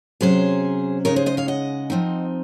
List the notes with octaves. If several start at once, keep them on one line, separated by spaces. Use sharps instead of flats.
C3 F#3 C#4 G#4 C5
C#3 G#3 D#4 A#4 C#5
G#4 C5
C5 D#5
C#5 F5
D#5 F#5
F3 C4 D#4